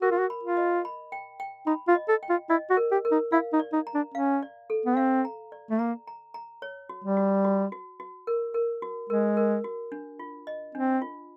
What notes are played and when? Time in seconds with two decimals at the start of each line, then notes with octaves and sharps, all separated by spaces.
0.02 F#4 A#4
0.11 F4
0.18 F#4
0.30 B5
0.43 F4
0.57 D#5
0.85 B5
1.12 G5
1.40 G5
1.67 D#4 B5
1.88 F4
1.95 D#5
2.08 A4
2.23 G5
2.29 F4
2.50 E4 D#5
2.70 F#4
2.77 A#4
2.91 G4
3.05 A#4
3.11 D#4
3.32 E4 F5
3.53 D#4
3.60 D5
3.73 D#4
3.87 A#5
3.95 D4
4.14 C#4 F5
4.43 D5
4.70 A4
4.86 B3
4.97 C4 F5
5.25 A#5
5.52 D5
5.70 A3
5.79 A#3 A#5
6.07 A#5
6.34 A#5
6.62 C#5
6.89 F#4
7.04 G3
7.17 F#4
7.45 F#4
7.72 F#4
8.00 F#4
8.27 A#4
8.54 A#4
8.82 F#4
9.09 G#3 A#4
9.37 A#4
9.64 F#4
9.92 D4
10.19 F4
10.47 D#5
10.75 C4 D4
11.02 F4